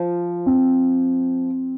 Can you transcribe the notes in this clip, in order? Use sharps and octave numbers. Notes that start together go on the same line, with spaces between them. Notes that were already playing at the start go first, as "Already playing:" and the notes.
Already playing: F3
C4